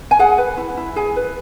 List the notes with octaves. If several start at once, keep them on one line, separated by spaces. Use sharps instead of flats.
G#5
G#4 F#5
B4
E4
E4
G#4 G#5
B4